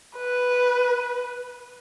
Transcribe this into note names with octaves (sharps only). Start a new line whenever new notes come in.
B4